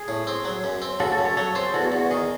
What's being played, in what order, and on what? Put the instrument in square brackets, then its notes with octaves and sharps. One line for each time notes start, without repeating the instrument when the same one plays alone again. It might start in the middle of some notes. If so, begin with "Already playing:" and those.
Already playing: [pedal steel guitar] G#4
[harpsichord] A2
C4
F#3
F#2
C4
[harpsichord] C#3 [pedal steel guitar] F#4 A4
[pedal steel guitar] F#4 A4
[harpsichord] F#2
[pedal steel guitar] A4 C#5
[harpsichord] F#3 [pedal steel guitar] A4 C#5
[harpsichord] C4 [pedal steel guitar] G#4 C5
[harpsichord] E2 [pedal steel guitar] F#4 A4
[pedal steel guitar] F#4
[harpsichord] E2
[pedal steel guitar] F#4
[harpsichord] D#3 [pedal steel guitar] G#4